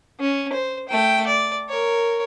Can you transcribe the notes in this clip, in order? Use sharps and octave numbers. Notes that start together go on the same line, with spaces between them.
C#4
C5
A3 G5
D5
A#4 C#5